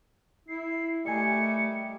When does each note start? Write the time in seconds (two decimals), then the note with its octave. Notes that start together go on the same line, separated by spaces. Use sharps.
0.48 E4 C7
1.06 G3 A3 A#4 D#5 G#5 C#7